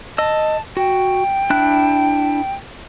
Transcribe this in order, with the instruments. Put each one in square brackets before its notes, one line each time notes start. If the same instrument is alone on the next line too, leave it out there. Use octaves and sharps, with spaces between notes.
[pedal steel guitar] D#5 E6 [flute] A5
[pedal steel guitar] F#4 [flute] G5
[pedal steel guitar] D4 E4 F#6